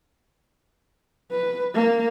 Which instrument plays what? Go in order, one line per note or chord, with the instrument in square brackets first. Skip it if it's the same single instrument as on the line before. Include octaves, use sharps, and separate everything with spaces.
[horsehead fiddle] B4
A#3